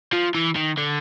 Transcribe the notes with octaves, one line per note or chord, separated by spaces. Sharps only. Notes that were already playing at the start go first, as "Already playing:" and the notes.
F3
E3
D#3
D3